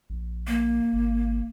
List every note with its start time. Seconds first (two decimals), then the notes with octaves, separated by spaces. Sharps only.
0.10 A#1
0.47 A#3
0.93 G#1